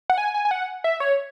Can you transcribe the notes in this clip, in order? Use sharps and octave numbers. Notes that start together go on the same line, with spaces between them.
F#5
G#5
G#5
G#5
F#5
E5
C#5